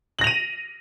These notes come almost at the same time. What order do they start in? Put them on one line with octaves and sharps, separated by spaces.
F#7 A#6 F7 D#7